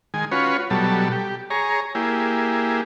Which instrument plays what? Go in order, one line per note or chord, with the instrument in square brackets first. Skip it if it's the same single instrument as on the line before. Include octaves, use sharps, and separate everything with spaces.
[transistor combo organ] D#3 G#3 G#5
C#4 F4 F#4 B4 C#5
B2 F#3 G3 A4
G4
G#4 C#5 A#5
A#3 E4 G4 G#4